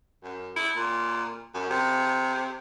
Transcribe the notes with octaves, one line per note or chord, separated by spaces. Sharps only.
F#2
E4
A#2
F#2
C3